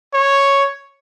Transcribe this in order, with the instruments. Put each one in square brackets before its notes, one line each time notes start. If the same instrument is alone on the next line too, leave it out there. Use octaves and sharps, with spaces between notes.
[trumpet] C#5